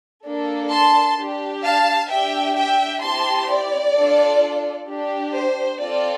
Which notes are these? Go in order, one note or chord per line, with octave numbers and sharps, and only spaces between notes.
A#3 D4 A4
A5 C6
D4 G4
F5 A5
D4 G4 E5 G5
E5 G5
C4 E4 G4 A5 C6
D5
D4 F4 A4
D4 G4
C5
C4 F4 A4 D5